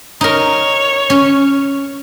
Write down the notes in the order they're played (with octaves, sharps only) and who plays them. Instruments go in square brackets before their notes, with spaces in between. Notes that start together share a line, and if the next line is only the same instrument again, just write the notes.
[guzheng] D#4 A#4 [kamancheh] C#5
[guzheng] C#4